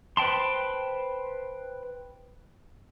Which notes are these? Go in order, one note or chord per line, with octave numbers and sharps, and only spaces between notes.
B4 C5 G5 A5 C6